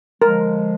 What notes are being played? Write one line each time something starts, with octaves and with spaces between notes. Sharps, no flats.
D3 F3 G#3 A#4